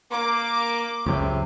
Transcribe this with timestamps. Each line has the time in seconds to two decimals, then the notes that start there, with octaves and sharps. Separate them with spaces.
0.12 A#3 D6
1.06 C#2 F#2 C3